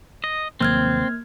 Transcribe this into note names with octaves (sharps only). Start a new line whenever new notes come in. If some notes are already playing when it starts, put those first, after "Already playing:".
D#5
F1 D#2 F#3 A#3 C4 F6 G#6